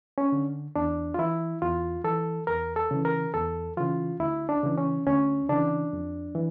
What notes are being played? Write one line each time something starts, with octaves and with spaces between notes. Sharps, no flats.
C#4
D3
E2 D4
F4
E3 E4
E2 F4
E3 A4
E2 A#4
A4
C#3 E3
A#4
E2 A4
C#3 E3 F4
D2 E4
D4
C#3 E3
C#4
D2 C#4
C#3 E3 D4
F2
E3